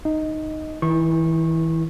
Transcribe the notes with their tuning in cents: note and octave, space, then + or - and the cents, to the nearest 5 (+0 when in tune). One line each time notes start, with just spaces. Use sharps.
D#4 -10 D#5 +10
E3 -30 E4 -5 C#6 -25